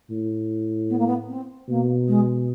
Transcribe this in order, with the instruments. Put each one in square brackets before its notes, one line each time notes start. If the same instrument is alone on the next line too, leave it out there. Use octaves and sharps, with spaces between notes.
[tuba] A2
[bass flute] B3
A#3
B3
C4
[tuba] B2 [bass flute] A#3
[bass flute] G#3